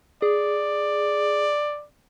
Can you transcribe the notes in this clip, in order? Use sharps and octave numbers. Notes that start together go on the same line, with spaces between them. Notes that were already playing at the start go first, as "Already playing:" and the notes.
G#4 D5